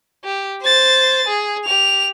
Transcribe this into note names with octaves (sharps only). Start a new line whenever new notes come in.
G4
C5 A6
G#4
G4 F7